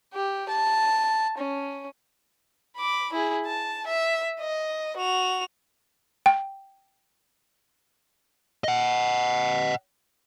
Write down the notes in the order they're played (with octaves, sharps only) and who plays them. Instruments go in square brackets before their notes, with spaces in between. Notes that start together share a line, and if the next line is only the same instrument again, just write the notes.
[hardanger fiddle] G4
A5
C#4
[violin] B5 D6
E4 G#4
A5
E5
D#5
F#4 F7
[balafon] G5
[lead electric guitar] D#5 F#5